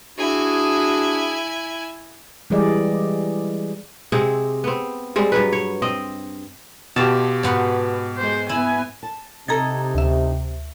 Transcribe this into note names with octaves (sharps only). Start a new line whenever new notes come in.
D4 E4 F#4 G#4 G#5
E3 G3 G#3 G#4 D5 D#5
C3 G#3 C4 G#4
B3 C4
G3 G#3 C4
G2 F#3 B4
C#5
C4 D#5
B2 F4 G4 A5
G#2 B3 F#4 B4
G#3 C5
B3 E4 G#5
A5
C3 D#4 A4 D#5 A#5 G#6 A6
D2 E5